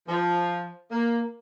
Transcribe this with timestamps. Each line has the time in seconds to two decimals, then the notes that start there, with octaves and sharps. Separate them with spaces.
0.09 F3
0.91 A#3